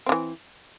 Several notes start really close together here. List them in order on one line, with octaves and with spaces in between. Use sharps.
C4 D3 E3